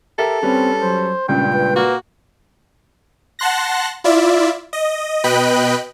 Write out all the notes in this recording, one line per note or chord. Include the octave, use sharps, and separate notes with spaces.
G4 A4 A#4 E5
G3 C4 C#4 B4
F#3 C5
C#2 G2 A#2 C#4 G5
B4
A#3 F#4
F#5 A5 C6 F#6 A#6
E4 F4 D5 E5
D#5
B2 B4 D#5 G5 B5 F#6